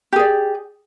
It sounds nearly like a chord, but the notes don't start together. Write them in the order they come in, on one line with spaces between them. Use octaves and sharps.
G4 G#4 D5